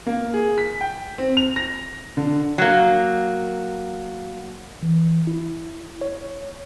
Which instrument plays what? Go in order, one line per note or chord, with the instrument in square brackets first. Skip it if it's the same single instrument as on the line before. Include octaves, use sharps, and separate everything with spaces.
[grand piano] A#3
G#4
B6
G5
C4
F7
A#6
D3
[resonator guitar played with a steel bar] F#3 A#3
[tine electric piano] E3
E4
C#5